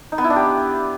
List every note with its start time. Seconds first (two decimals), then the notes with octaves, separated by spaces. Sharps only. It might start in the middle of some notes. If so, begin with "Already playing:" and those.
0.12 D#4
0.18 B3
0.24 E4
0.30 D4
0.36 G4